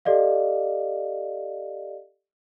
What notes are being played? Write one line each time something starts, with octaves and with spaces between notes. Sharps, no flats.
G4 A4 D5 D#5 F5